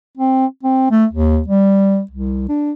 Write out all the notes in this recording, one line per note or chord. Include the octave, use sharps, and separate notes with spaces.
C4
C4
A3
D#2
G3
C2
D4